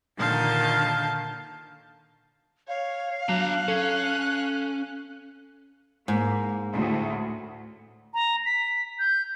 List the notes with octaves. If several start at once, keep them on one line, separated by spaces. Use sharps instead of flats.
A#2 D3 D#3 F5 A5 G6
C#5 F5
F#3 D4 A#5 F#6
C#4 A4
G#2 A#3
D2 A2
A#5
B6
G6